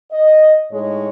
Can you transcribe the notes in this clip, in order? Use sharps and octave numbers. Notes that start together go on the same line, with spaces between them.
D#5
A2 G#3 D#4 C#5